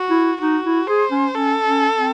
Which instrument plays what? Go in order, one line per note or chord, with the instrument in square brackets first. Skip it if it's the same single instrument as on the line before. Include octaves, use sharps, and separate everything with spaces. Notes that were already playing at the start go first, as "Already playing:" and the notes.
Already playing: [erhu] F#4
[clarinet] E4
[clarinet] D#4 [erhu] F#4
[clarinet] E4
[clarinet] G#4 [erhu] C5
[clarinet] C#4
[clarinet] C#4 [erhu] A4
[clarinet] C#4
C4